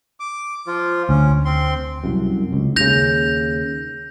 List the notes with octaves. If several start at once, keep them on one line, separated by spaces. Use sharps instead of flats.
D6
F3 F4
D2 C#4
C4 C6
C2 F#2
C#2
D#2 C#3 G6 A#6 F7